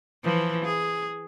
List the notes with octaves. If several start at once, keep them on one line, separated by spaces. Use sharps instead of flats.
E3 F3
G#4